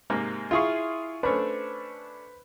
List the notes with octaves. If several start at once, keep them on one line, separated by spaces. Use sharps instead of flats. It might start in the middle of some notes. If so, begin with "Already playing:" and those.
G#2 C3 A#3
E4 F4 G#4 F5 B5 C#6
A3 C#4 D4 B4 C5 B5